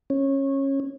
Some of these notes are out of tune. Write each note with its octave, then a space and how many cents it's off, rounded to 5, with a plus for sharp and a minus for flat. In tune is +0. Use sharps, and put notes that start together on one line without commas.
C#4 -20